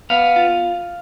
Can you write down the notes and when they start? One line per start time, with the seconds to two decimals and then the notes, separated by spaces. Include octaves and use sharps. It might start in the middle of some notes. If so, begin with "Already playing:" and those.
0.10 B3 F5
0.36 F4